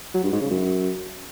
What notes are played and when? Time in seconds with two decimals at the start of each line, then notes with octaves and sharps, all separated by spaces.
0.14 F#3
0.23 G2
0.32 G#2
0.41 C#3
0.51 F#2